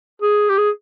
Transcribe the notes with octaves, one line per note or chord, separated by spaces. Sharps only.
G#4
G4
G#4